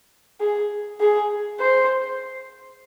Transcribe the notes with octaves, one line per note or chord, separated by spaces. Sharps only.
G#4
G#4
C5